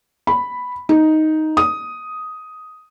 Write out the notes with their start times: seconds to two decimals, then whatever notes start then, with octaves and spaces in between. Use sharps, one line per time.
0.27 B5
0.89 D#4
1.57 D#6